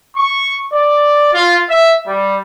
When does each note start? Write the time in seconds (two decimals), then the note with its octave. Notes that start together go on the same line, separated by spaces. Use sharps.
0.15 C#6
0.72 D5
1.34 F4
1.69 E5
2.05 G3